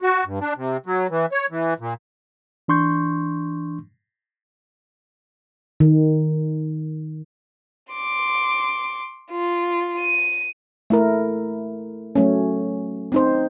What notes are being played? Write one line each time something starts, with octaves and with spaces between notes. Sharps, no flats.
F#4
G2
D4
C3
F#3
E3
C#5
E3
A#2
E3 D4 C6 C#6 G6
D#3
C6 D6
F4
D#7
A3 E4 A#4
F#3 A3 C#4
C4 D#4 C5